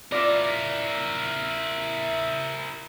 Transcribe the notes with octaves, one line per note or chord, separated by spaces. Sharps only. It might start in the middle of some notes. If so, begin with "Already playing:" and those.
E4 F4 A#4 D5